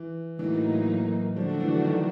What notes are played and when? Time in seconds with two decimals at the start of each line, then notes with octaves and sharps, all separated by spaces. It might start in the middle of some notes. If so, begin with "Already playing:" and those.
Already playing: E3
0.39 A2 E3 F#3 A#3 D#4
1.36 D3 F3 F#3 A3 D4 F#4
1.60 E3
1.85 D#3